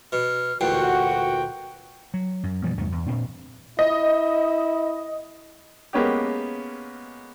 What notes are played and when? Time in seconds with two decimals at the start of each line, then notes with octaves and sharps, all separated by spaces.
0.12 B2 F6
0.61 A1 D2 A#2 F#4 F#5 G5
2.14 F#3
2.43 F#2
2.64 B2 E3 F3 G3
2.78 E2 G2 C3 A3
2.92 E2
3.07 A#2 C4 D4
3.79 E4 D#5
5.93 G#3 A#3 B3 C#4 G4